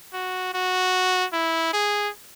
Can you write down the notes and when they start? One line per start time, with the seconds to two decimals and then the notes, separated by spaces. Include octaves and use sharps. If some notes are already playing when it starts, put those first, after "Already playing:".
0.13 F#4
0.54 F#4
1.33 E4
1.73 G#4